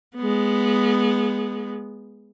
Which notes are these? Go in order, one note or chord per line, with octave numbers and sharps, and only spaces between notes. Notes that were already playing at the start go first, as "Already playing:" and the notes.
G#3 B3